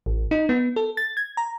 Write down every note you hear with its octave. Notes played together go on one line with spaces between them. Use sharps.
A1
D#4
B3
A4
A6
G#6
A#5